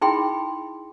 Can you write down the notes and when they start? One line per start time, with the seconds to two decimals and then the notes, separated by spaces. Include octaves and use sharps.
0.01 D#4 E4 G#4 G5 B5 C6